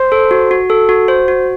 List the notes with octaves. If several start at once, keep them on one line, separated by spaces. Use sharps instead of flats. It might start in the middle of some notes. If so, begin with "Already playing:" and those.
Already playing: C5
A4
F#4
F#4
A4
F#4
C5
F#4